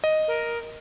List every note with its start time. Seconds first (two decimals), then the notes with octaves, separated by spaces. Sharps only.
0.04 D#5
0.28 A#4